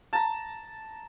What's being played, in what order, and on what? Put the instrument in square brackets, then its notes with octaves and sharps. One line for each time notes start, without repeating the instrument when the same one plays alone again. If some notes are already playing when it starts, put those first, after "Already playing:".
[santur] A5 A#5